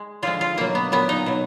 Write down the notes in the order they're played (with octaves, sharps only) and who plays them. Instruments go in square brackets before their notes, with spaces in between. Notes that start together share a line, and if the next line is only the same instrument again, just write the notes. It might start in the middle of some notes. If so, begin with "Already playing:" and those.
Already playing: [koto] G#3
D3 F3 G#3 F4
F4
B2 F#3 A#3
B3
A#2 F#3 B3
D#4
B2 F#3